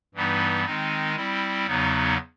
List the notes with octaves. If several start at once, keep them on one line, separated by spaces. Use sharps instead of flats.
G2 E3 G3 B3 D#4
D#3 G#3 C4 D#4
G3 C4 E4
E2 C#3 F#3 B3 D#4